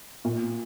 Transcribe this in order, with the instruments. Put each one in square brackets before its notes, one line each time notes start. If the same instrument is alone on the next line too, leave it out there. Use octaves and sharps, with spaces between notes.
[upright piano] A#2